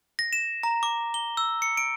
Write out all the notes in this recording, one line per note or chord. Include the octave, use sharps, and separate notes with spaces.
A#6
E7
A#5
D6
G7
E6
C#7
D7